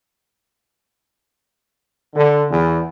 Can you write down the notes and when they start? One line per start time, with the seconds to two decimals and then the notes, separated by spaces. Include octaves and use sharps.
2.16 D3
2.51 E2